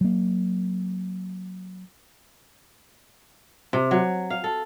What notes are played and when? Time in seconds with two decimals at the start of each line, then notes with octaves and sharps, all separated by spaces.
0.01 F#3 A#3
3.73 C3
3.91 F#3
4.30 F5
4.44 A4